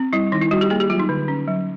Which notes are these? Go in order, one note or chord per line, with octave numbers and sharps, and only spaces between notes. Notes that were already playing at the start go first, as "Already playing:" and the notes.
Already playing: C4
G3 E4
D#3 D#4
E4
G3 F#4
G4
A#3 G#4
G4
F#3 F4
D#4
D3
C#4
F#3